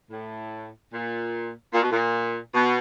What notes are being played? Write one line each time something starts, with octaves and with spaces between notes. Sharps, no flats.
A2
A#2
A#2
B2
A#2
B2